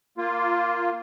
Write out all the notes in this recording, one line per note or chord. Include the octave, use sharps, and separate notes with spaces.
A#3 F4